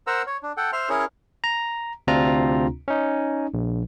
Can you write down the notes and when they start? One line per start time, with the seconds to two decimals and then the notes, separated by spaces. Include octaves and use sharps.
0.07 A#4 C5 F#5 A#5 E6
0.27 C#5
0.43 D4
0.57 A4 F#5 G5
0.73 C5 E5 C6 F6
0.89 C#4 E4 G#4 A#4 C#5
1.44 A#5
2.07 D2 C3 C4 D4 F4 A#5
2.88 C#4 D#4
3.54 A#1